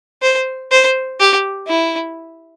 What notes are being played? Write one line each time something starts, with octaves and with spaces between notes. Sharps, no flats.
C5
C5
G4
E4